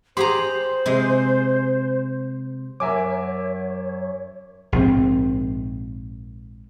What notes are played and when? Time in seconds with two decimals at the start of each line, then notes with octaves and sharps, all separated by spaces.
0.17 G4 G#4 C5 A#5 C6
0.86 C3 G#3
2.80 F#2 A#4 C#5 E5 G#5 D6
4.72 A#1 G#2 C4